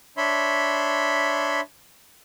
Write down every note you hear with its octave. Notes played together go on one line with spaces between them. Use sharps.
D4 C#5 E5 B5 C6